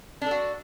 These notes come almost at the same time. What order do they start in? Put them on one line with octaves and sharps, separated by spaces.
D4 A4 F#4